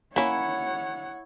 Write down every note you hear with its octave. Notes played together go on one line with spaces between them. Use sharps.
A#3 C#4 E4 C#5 F#5